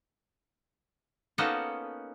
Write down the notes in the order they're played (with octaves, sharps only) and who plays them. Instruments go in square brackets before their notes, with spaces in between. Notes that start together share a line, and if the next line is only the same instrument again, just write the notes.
[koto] A#3 B3 C#4 D#4 F#4 A4